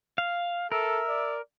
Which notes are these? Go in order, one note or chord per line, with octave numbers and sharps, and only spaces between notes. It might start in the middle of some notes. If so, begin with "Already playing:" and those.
F5
A4 A#4 E5
D5